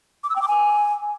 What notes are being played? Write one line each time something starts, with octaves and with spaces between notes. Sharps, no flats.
D6
E6
G5
D6
G#5